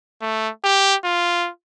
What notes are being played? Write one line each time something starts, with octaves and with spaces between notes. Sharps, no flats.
A3
G4
F4